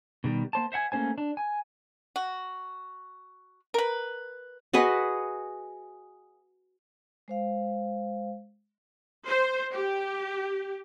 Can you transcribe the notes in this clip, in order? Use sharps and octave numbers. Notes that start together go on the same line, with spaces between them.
B2 D#3 G3
A#3 C5 A5
C5 E5 F#5 G#5
A3 A#3 C#4 C5 G#5
D4
G#5
F#4
A#4 B4
F#4 G#4 B4 D#5
G#3 C5 F5
C5
G4